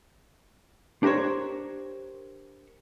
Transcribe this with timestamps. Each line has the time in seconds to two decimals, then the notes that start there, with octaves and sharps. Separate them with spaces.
1.03 D4 G4 A#4 C5 C#5